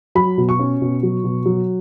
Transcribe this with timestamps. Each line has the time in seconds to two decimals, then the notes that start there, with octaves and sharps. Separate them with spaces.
0.15 F#3 B5
0.38 B2
0.49 C#6
0.59 C#4
0.81 B2
1.03 F#3
1.24 B2
1.46 F#3